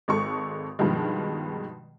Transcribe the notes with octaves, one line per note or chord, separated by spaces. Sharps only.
G#1 G#3 A4 C#6
G2 B2 D#3 F3 G#3